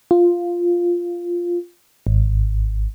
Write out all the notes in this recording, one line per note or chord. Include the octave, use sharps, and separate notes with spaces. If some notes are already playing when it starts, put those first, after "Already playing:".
F4
G#1